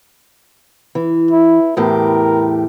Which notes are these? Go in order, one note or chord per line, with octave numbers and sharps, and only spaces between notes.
E3
E4
E2 A2 G4 A#4